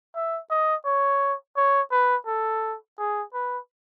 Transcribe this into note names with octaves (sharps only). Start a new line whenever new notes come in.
E5
D#5
C#5
C#5
B4
A4
G#4
B4